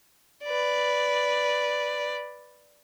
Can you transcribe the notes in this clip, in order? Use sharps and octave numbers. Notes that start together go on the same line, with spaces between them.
B4 D5